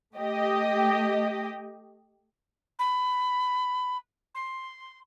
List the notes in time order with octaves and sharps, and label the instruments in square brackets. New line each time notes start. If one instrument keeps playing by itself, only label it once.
[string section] A3 G4 D#5
[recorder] B5
C6